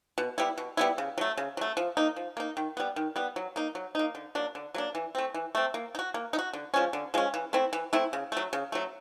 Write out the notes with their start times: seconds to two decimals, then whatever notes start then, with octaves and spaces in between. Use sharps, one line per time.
0.18 B2
0.38 G3 B3 E4
0.58 B2
0.77 G3 B3 E4
0.98 C#3
1.18 F#3 A3
1.37 C#3
1.57 F#3 A3
1.77 F3
1.97 A#3 D#4
2.16 F3
2.37 A#3 D#4
2.57 D#3
2.77 G3 B3
2.96 D#3
3.16 G3 B3
3.36 F#3
3.56 A#3 D#4
3.75 F#3
3.95 A#3 D#4
4.15 D3
4.35 F#3 A#3 D4
4.55 D3
4.74 F#3 A#3 D4
4.95 E3
5.15 A3 C4
5.34 E3
5.55 A3 C4
5.74 A#3
5.95 D#4
5.99 F#4
6.14 A#3
6.33 D#4
6.39 F#4
6.53 D3
6.74 F3 G#3 C#4
6.93 D3
7.14 F3 G#3 C#4
7.34 E3
7.53 A3 C4 E4
7.73 E3
7.93 A3 C4 E4
8.13 C#3
8.32 F#3 A3
8.53 C#3
8.72 F#3 A3